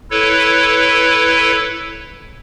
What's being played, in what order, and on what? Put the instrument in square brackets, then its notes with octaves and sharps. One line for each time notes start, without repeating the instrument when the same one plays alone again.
[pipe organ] E4 A4 B4 C#5